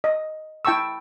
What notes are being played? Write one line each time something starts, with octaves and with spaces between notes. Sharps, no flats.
D#5
E4 G5 A5 C#6 E6